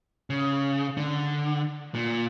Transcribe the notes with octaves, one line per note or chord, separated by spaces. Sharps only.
C#3
D3
A#2